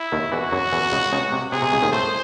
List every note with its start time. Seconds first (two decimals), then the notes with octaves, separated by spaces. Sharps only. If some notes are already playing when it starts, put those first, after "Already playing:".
Already playing: E4
0.12 D#2 D#3
0.32 E2 E3 F#4
0.52 F#2 F#3
0.72 E2 E3
0.92 C#2 C#3
1.12 C#2 C#3
1.32 C3
1.52 C3 G#4
1.62 C3
1.73 C#2 C#3
1.82 D#2 D#3
1.92 A2 A3 C5